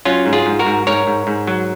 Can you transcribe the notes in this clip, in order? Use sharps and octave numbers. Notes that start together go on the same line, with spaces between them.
F#3 C#4 F4
G#2
F4 G#4
G#2
F#4 A#4
G#2
G#2 A#4 C#5
G#2
G#2
F#3